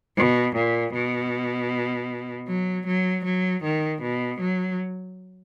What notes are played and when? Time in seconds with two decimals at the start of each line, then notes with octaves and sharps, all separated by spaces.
0.18 B2
0.56 A#2
0.94 B2
2.48 F#3
2.87 F#3
3.25 F#3
3.64 D#3
4.02 B2
4.41 F#3